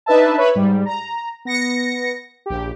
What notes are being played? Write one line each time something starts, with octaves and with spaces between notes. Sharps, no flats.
D4 D#4 B4 E5 A5
B4 C#5 E5 B5
G#2 G3
A#5
B3 A#6 C#7
A#1 G4